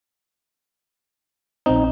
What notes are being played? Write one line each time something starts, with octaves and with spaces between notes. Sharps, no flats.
A#1 C4 D#4